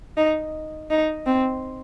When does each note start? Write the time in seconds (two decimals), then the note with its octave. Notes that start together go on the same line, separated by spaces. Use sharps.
0.17 D#4
0.90 D#4
1.26 C4